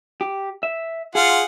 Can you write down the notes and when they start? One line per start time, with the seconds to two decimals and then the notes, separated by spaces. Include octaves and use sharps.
0.21 G4
0.63 E5
1.15 F4 G#4 F#5